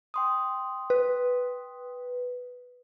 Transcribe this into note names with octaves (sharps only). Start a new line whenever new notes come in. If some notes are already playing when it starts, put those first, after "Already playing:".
G5 C6 D#6
B4